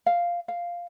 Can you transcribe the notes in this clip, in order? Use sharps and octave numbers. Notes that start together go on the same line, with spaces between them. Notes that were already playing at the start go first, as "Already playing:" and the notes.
F5
F5